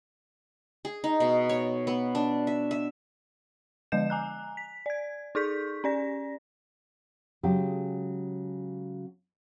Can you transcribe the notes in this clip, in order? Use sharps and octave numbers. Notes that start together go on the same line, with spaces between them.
G#4
D#4
B2
C#5
B3
D4
E5
E5
D3 F3 G#3 D#5 G6 E7
G#5 A#5 F#6
B6
D5 G#6
D#4 G#4 C#6 G6 B6
C#4 D5 A#6
C#3 F#3 G#3 G4